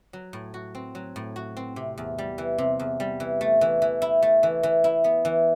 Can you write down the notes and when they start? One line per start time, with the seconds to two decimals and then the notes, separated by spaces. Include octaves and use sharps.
0.13 F#3
0.33 A2
0.54 F#4
0.75 C4
0.95 F#3
1.16 A2
1.36 F#4
1.57 C4
1.76 C3
1.98 E2
2.18 G3
2.38 E3
2.58 C3
2.80 E2
3.00 G3
3.20 E3
3.41 A3
3.61 E3
3.82 E3
4.02 E4
4.22 A3
4.43 E3
4.63 E3
4.84 E4
5.04 B3
5.25 E3